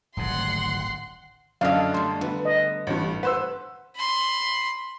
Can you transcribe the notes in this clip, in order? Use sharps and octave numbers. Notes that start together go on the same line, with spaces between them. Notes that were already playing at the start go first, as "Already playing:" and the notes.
D1 G#1 G2 F#5 C6
F#2 D3 D4 A4 D#5 F5
G3 A3 C6
D3 B3
D#5
A1 G2
B4 C5 F#5 E6
B5 C6